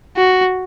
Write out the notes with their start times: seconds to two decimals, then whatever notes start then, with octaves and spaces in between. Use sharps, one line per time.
0.17 F#4